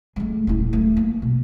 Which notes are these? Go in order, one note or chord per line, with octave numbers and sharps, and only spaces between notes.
G#3 A3
D#1 E4
A3
A#3
B2